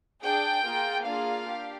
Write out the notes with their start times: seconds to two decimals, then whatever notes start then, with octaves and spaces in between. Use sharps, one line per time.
0.21 D4 G#4 G5
0.63 A#3 F4 G#4
1.04 A#3 D4 F4 G#4 F5
1.46 D4 G4